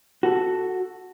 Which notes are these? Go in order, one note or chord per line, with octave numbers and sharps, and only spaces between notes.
F#4 A4